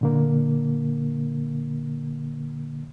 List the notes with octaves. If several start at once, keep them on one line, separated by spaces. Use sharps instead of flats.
A#2 D3 A#3